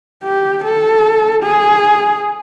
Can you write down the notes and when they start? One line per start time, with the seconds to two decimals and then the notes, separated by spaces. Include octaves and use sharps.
0.24 G4
0.65 A4
1.44 G#4